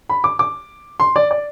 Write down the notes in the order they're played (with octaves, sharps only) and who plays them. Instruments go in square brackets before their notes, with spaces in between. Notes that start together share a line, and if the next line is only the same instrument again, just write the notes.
[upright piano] B5
D6
D6
C6
D5
D5